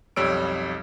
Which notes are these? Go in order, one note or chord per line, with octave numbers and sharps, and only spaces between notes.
B1 F2 G3 C#5 E6 D7